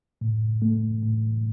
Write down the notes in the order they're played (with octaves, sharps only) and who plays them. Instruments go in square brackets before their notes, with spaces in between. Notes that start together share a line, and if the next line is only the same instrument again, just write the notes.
[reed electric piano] A2
A3
A2